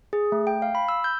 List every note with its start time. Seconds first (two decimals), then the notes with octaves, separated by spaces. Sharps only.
0.13 G#4
0.32 A3
0.47 G5
0.62 F5
0.75 B5
0.88 E6
1.04 G6